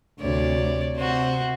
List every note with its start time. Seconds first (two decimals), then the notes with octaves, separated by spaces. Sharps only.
0.20 D2 C3 C#5 D5
0.97 C3 F#4 C5